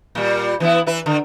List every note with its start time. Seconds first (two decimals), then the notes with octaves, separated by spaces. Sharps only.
0.15 A#2 G3
0.60 E3 B3 E4
0.86 E3 E4 B4
1.06 D3